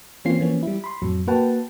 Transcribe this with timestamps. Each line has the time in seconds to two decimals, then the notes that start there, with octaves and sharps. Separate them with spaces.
0.25 E3 A#3 C4 C#4 F4 C7
0.40 E3 F3 A#3 B3 C#4
0.63 G3 E4
0.84 B5 C6
1.02 F2 A2 F#3
1.27 A#3 F#4 B4 F#5 G5 A5